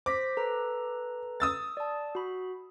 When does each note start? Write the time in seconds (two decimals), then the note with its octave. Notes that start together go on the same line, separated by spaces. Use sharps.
0.06 C5 D6 A#6 B6
0.37 A4 B4 A#5
1.40 D#6 E6 A6
1.77 D5 A5
2.15 F#4 B5